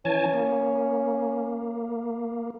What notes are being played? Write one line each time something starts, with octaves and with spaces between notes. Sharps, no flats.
E3 C#4 G#5 A5
A#3